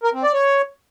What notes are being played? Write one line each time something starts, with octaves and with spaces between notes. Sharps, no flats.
A#4
C4
D5
C#5